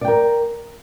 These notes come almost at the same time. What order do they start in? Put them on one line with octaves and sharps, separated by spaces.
D5 G5 A#4